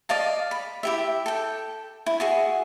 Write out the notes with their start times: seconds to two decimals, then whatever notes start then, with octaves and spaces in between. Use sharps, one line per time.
0.09 D5 D#5 F5 A5
0.51 B5
0.83 E4 G4 E5
1.26 A4 G5
2.06 E4
2.20 F#4 G#4 E5